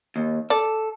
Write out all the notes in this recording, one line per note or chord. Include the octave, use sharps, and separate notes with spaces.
D#2
A4 D5